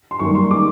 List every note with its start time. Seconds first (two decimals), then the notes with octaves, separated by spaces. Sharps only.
0.11 C6
0.19 F#2 D#3 G3 A#3 C#6
0.35 C6
0.50 D#3 G#3 D6